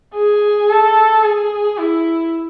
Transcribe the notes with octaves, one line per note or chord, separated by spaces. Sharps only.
G#4
A4
G#4
E4